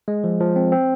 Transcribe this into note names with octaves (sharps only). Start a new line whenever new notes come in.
G#3
F3
F3
C4
C4